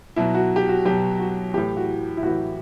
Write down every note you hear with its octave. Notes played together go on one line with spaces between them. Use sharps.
B2 F#3 E4
F#4
G4
F#4
B2 F#3 G4
F#4
A2 E3 G4
F#4
E4
A2 E3 F#4